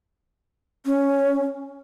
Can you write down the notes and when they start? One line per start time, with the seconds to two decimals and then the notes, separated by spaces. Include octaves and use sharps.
0.86 C#4